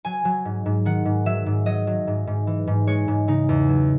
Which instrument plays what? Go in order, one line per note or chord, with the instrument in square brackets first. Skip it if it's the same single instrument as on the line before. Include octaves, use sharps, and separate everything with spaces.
[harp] F#3 G#5
F#3
G#2
G#2
D#3 F#5
G#2
F#3 E5
G#2
F#3 D#5
F#3
G#2
G#2
E3
G#2
G#3 C#5
G#2
C#3 D#4
E2
F#3